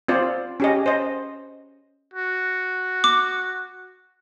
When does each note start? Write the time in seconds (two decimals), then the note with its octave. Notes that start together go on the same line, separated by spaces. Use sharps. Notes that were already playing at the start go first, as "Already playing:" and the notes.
0.08 C4 F4 C5 D5
0.60 C#4 G4 D#5
0.86 C5 D#5
2.14 F#4
3.04 D6